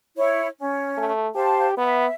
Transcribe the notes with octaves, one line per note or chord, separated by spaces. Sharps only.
E4 C#5
C#4
A3
G4 C5 F5 A5
B3 E5